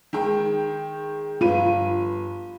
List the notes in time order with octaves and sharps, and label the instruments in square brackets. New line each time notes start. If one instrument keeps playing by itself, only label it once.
[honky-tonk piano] D#3 G#3 G5
[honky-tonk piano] G1 B4 D#7 [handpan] F4